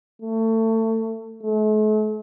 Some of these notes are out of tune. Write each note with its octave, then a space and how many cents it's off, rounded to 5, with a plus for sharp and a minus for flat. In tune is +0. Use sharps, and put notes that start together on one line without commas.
A3 +25
A3 -45